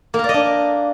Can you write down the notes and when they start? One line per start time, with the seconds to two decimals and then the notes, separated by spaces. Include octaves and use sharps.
0.14 A#3
0.19 A#4
0.24 D5
0.29 D#5
0.34 D4